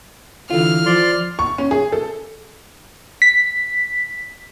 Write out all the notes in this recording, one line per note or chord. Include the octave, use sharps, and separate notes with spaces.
D3 E3 F4 F6
F3 D5 C6
C#6
C#4
G#4
A4
B6